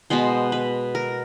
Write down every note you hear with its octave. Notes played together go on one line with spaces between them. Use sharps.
B2 G#3 B3 C5
B4
A#4